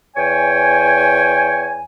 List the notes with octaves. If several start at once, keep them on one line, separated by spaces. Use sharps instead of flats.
E2 C#5 G5 G#5